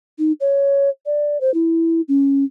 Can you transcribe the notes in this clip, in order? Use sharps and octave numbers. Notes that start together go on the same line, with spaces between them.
D#4
C#5
D5
C5
E4
C#4